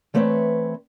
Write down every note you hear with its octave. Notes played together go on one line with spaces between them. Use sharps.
E3 A3 C4 B4 C#5